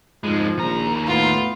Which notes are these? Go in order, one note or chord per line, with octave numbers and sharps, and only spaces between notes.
F2 G#2 F3 G#3
A#1 D#2 A#5
A2 B3 F4